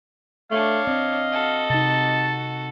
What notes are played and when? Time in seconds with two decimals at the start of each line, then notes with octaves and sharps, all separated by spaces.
0.51 A3 D4 C#5 F5
0.87 C4 D#5
1.32 F#4 A4
1.70 C3 D#4 A5